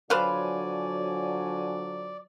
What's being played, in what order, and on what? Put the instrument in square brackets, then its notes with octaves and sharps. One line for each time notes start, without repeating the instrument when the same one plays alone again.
[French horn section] D3 F3 F#3 [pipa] B4 C5 F5 [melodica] D5 [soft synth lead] G#5